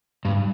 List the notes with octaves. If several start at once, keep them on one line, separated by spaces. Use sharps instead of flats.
G2